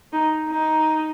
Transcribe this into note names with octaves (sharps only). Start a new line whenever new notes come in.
D#4
D#4